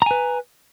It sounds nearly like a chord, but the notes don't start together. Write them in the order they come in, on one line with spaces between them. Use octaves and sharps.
A#5 G#5 B4